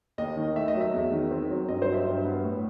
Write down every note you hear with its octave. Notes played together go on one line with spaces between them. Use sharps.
D#2 D#5
D#3
A3 E5
D#5
F#3
E5
E2
D#3
C4
F#3
G2 D#5
C5
F#3
E5
G2
B3
A2